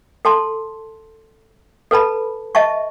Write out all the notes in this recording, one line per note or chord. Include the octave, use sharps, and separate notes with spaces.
A4 A5 C6
A4 B4 A5 B5
D#5 E5 A5 C#6